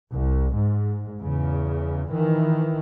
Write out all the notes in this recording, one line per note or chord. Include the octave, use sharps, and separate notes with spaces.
C2
G#2
E2 C#3
D#3 E3